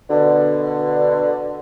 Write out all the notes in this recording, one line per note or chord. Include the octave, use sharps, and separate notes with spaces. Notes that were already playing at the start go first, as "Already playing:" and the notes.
B2 D3